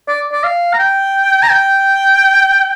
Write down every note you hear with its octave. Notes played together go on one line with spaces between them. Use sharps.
D5
D5
F5
A#5
G5
A#5
G5